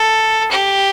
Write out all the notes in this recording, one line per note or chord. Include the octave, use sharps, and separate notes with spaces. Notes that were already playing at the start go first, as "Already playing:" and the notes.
Already playing: A4
G4